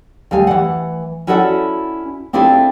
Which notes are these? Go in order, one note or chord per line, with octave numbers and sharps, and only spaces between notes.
D2 G3 F5 G#5
E3 F#5
C#4 E4 F#4 A4 D5 F#5
C4 D4 E4 F4 G#4 A4